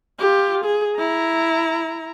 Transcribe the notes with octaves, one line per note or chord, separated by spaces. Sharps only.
F4 G4
G#4
E4 A#5